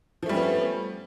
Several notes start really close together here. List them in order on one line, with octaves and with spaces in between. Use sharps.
F3 A3 G3 C#4 B3